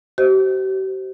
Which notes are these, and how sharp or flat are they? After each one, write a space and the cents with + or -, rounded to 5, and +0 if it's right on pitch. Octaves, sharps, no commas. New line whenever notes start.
G4 -45 C5 +0 D#5 +0